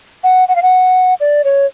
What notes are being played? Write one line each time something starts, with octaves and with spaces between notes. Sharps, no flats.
F#5
F#5
F5
F#5
D5
C#5